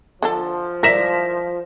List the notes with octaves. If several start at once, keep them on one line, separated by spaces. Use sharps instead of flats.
D3 F3 D4 A4
E4 A#4 D5 E5 A#6 B6 E7